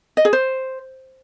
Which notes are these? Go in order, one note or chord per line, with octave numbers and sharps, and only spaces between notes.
D#5
G#4
C5